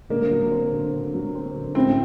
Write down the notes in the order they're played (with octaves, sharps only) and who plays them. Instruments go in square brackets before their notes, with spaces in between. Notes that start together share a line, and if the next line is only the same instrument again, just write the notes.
[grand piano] D3 [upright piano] A#3
[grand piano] F#3
C4
D3
D3
F#3
C4
D3
[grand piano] A2 [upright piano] C4